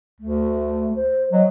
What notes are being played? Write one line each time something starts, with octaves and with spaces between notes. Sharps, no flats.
D2 A3
C5
F#3 D#5